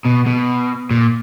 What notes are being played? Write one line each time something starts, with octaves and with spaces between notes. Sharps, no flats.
B2
B2
A#2